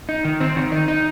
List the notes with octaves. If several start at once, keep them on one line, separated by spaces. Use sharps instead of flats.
D#4
D#3
C4
D#3
D#4
D#4